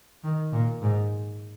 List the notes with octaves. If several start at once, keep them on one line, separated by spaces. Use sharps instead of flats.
D#3
A#2
G#2